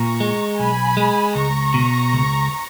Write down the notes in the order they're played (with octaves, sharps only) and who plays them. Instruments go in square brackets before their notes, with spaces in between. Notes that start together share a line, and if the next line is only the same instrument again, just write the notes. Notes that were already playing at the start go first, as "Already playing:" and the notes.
Already playing: [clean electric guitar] A#2 [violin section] A#5 C#6
[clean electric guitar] G#3
[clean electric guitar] B1 [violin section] G#5 B5
[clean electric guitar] G#3
[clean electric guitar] C#2 [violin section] A#5 C#6
[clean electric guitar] B2
C#2